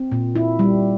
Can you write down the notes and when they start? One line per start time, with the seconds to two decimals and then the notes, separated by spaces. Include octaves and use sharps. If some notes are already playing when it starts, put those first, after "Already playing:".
Already playing: C4
0.12 A#2
0.36 E4
0.59 G3